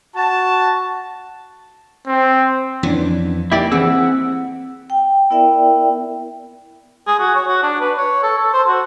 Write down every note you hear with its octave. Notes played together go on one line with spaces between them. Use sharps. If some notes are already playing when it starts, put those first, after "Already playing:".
F#4 A5
C4
F2 E3 B3 C#4 D4
A#3 E4 G4 D5
E3 C4 G#4 F#5 E6
G5
B3 E4 A#4 D5 E5 G5
G#4
F#4
C#5
F#4
D4
B4
C#5
A4
A4
C5
F#4